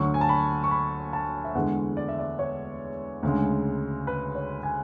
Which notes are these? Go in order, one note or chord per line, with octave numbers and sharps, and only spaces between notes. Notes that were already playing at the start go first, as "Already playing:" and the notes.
Already playing: D2 D3 F#3 C#6
G#5
A5
B5
C#6
B5
A5
E5
E2 D3 G#3 F#5
D5
E5
D5
C#5
D2 C#3 G#3
B4
C#5
G#5